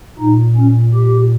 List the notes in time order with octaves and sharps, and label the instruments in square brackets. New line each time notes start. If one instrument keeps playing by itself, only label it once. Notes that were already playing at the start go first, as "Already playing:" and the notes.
[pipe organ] A#2 D#4
C#4
G4